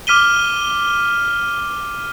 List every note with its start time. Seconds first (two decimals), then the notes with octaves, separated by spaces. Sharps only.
0.07 D6 F6 B6 D#7 G7